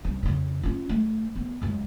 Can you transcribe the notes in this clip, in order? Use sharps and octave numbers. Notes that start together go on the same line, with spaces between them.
C2 C#4
F2 C#3
C#4 F4
A3
B3
C#2 F#2